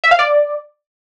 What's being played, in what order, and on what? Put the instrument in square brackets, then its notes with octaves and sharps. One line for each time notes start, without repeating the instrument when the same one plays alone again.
[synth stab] E5
F5
D5